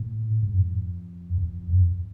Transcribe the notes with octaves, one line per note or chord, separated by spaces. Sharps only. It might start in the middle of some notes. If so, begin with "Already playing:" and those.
Already playing: A2
G#2
F#2
F2
F2
F#2
F2